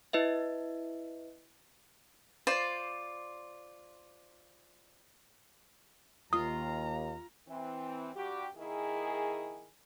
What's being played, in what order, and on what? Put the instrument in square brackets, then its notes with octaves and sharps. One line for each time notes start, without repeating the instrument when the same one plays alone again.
[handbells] E4 B4 D#5 E5
[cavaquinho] F4 C5 D5
[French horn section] D#2 [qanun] F4 [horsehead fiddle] A#5 [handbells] D#6
[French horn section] E3 C4
G2 G3 F#4 G4
D#3 A#3 E4 G#4